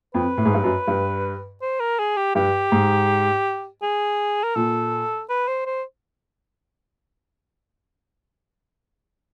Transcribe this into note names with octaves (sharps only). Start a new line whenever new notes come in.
F2 B4
A2
G#2
G2
F#2
G2
C5
A#4
G#4
G4
G2 G4
G#2
G#4
A#4
A#2 A4
B4
C5
C5